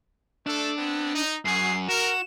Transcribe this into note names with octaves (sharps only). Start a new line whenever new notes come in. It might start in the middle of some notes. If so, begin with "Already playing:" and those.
A3 D4 A4
B3 C4
D#4
F#2 F#4 G#4 C7
F#4 A#4 E7